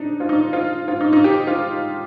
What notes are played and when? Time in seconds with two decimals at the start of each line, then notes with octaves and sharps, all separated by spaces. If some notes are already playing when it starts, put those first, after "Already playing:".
Already playing: D4 D#4
0.20 F4
0.29 D#4
0.53 F4
0.88 F4
1.01 D#4
1.13 D#4
1.24 G4
1.47 F4